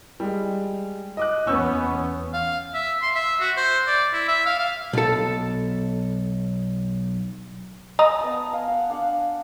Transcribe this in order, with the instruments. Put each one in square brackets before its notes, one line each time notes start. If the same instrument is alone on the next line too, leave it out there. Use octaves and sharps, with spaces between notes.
[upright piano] G3 G#3
D#5 D6 F#6
[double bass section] E2 B3 C#4 [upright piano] C#6 E6 G6
[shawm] F5
E5
C6
E5
F#4
C5
D5
E4
E5
F5
F5
[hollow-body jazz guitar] B1 A4
[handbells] D#5 A#5 D#6 [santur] G#5
[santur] B3 A5
F5 G#5
F5 F#5
D4 F5 F#5